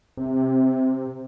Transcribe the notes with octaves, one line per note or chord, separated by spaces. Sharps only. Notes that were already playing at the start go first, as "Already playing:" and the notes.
C3